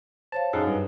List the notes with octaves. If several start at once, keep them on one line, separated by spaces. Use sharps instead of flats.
C5 C#5 F5 A5
F#2 D#4 G#4 A4 F5 F#5
G2